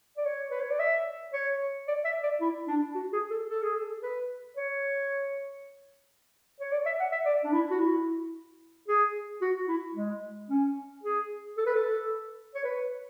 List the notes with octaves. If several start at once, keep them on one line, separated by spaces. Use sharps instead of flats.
D5
C#5
B4
C#5
D5
E5
C#5
D5
E5
D5
E4
D4
F#4
G#4
A4
A4
G#4
A4
B4
C#5
C#5
D5
E5
F#5
E5
D5
D4
E4
F#4
E4
G#4
F#4
E4
G#3
C#4
G#4
A4
B4
A4
C#5
B4